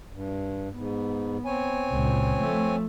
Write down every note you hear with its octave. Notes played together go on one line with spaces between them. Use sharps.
G2
G#2 B3
C4 C#5 G#5
C#2 A#2
F3 A3